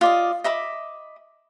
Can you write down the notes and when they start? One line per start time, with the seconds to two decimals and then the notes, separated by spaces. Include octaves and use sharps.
0.01 F4 D5 D#5
0.44 D#5 E5 B5 D6